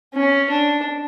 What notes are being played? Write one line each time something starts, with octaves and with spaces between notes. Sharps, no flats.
C#4
D4